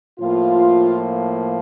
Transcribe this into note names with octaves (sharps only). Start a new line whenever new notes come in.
A2 F3 A#3 F4